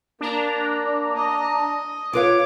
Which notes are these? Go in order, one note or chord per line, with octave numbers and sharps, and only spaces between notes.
A#3 D4 A#5
D#5
F4 B4 C#5 F5 D6